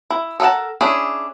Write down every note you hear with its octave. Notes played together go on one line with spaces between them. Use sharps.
E4
A4 A#4 D#5 F#5 A5
C#4 D4 E4 G#4